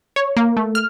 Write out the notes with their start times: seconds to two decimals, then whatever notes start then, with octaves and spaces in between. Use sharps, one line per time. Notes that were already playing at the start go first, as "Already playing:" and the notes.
0.16 C#5
0.37 A#3
0.57 A3
0.75 F6